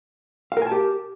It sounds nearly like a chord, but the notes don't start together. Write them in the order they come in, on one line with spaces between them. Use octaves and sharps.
F5 A#4 G#5 A5 G4